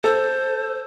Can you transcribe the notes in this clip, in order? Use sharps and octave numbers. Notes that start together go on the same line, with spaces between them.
A4 C5